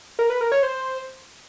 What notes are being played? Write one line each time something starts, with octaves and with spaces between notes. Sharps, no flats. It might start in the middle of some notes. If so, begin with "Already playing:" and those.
A#4
B4
A#4
C#5
C5